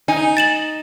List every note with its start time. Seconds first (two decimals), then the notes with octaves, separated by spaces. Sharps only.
0.08 D#4 G#5
0.37 A6 E7 F#7